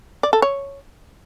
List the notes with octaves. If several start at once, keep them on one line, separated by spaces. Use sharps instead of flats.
D5
A4
C#5